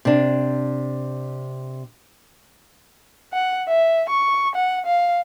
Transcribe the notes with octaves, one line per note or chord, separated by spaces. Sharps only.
C3 D4
F#5
E5
C#6
F#5
F5